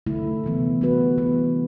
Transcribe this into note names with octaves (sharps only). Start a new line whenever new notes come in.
D3 A3 E4
C3 E3 B3
G3 B3 F#4 B4
E3 B3 E4